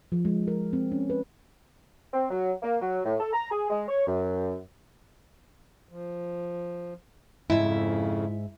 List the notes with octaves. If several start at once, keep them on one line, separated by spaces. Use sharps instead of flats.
F3
G#3
A#4
C4
C#4
B4
C4
F#3
A#3
F#3
A2
A4
A#5
G#4
G#3
C#5
F#2
F3
F2 G#2 C#3 E4 E5